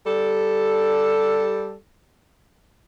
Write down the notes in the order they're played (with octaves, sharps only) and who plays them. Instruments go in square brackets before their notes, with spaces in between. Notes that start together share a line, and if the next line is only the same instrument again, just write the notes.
[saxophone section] G3 A4